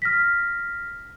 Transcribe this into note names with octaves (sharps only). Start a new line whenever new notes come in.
F6 A#6 B6